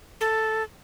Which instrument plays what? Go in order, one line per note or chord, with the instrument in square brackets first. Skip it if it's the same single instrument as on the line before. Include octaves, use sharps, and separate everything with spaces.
[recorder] A4